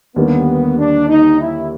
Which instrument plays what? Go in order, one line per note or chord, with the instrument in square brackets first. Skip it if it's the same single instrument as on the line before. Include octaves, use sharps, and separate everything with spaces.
[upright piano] D#2 D3 G3 A#3 [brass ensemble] B3
[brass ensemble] D4
D#4
E4